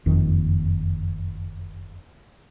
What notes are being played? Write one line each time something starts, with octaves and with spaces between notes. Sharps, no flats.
F#1 F2 D#3